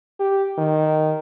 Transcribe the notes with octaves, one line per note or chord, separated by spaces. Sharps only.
G4
D#3